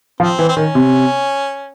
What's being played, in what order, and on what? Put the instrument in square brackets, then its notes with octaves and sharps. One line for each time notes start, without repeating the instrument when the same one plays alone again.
[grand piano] F3 [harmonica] C4
[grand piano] E3
[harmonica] C4
[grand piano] D#3 [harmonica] C#4
[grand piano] C3